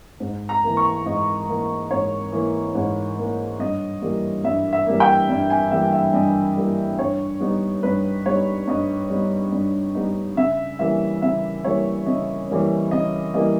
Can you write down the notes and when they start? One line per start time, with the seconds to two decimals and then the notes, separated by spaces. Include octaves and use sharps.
0.20 G#2
0.49 A#5
0.64 E3 A#3
0.77 C#6
1.06 G#2 D#5
1.48 E3 A#3
1.91 G#2 C#5
2.32 E3 A#3
2.75 G#2
3.18 E3 A#3
3.59 G2 D#5
4.01 E3 G3 A#3
4.44 G2 E5
4.73 E5
4.86 E3 G3 A#3
5.00 G5
5.29 G2
5.50 G#5
5.71 E3 G3 A#3 E5
5.93 E5
6.13 G2 D#5
6.57 E3 G3 A#3
6.99 G2 C#5
7.40 G3 B3 D#4
7.83 G2 B4
8.26 G3 B3 D#4 C#5
8.68 G2 D#5
9.10 G3 B3 D#4
9.52 G2
9.94 G3 B3 D#4
10.37 C#3 E5
10.79 E3 G3 A#3 C#4 E5
11.22 C#3 E5
11.64 E3 G3 A#3 C#4 C#5
12.06 C#3 D#5
12.50 E3 G3 A#3 C#4
12.91 C#3 D#5
13.34 E3 G3 A#3 C#4 D#5